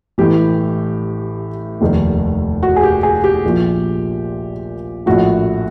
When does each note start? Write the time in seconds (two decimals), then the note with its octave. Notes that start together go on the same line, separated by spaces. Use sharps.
0.18 A1 A2 E3 G4
1.81 F1 D#2 D#3
2.63 F#4
2.76 G#4
2.83 G4
3.03 G#4
3.24 G4
3.44 A#1 A#2 F3
5.06 A#1 A2 F3 F#4